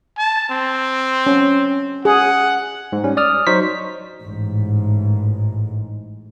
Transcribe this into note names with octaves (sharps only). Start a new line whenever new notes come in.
A5
C4
C#4
G#4 F#5
G#2
G3 C#4
D5 D#6 F6
F#3 D#4 C5 C#6 B6
A1 G#2